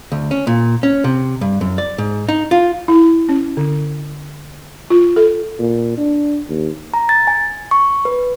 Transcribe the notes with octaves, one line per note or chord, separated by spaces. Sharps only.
D2
C#4
A#2
C#4
C3
G2
F#2
D5
G#2
D#4
F4
E4
C#4
D3
F4
A4
A#2
D4
D#2
A#5
A6
G#5
C#6
B4